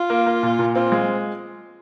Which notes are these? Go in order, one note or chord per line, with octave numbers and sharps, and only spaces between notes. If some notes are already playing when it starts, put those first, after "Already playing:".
Already playing: F4
A#3
A#3
A#2
A#2
C4 F4
G#3